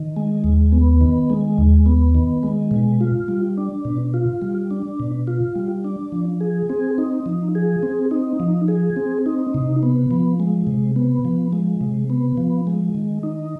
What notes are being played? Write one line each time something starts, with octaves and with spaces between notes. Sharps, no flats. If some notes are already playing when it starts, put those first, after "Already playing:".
Already playing: D#3
G#3
D#2
B3
D#3
G#3
D#2
B3
D#3
G#3
B2
F4
G3
D4
B2
F4
G3
D4
B2
F4
G3
D4
F3
G#4
C4
D#4
F3
G#4
C4
D#4
F3
G#4
C4
D#4
C3
B3
F3
G#3
C3
B3
F3
G#3
C3
B3
F3
G#3
D#3
D#4